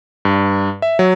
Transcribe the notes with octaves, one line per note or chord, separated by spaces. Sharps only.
G2
E5
F#3